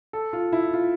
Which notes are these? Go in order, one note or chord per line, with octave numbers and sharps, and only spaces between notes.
A4
F4
E4
F4